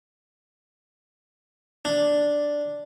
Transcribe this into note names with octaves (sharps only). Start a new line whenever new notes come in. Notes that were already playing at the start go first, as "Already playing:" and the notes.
D4